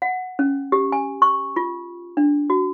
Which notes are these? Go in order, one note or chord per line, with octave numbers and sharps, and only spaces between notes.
F#5
C#4
G4
G#5
C#6
F4
D4
F#4